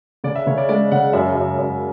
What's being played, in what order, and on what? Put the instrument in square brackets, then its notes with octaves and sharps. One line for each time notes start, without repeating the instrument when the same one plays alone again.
[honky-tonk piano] C#3 [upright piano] D5
[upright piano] E5
[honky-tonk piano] C#3 [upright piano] C#5
[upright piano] D5
[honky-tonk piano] G#3 [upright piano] D5
[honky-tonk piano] C#3 [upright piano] F#5
[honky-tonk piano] F#2 [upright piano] E5
[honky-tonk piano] F#2
F#2